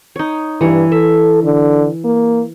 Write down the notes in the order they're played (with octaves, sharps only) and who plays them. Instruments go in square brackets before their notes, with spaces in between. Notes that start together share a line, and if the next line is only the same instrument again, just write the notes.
[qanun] D#4 C#5
[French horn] G2 [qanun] E3 C#5
[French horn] A4 [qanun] E5
[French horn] D3
A#3